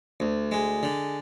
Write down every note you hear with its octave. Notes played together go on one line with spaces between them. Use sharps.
D2
G#3
D3